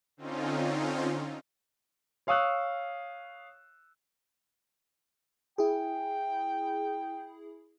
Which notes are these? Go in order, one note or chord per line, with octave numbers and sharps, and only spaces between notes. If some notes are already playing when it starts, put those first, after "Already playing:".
D3 C4 C#4 D#4 F4
C#5 F5 C#6 D#6 E6 F#6
E4 G#4 G5